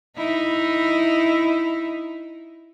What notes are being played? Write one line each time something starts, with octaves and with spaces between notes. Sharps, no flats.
D#4 E4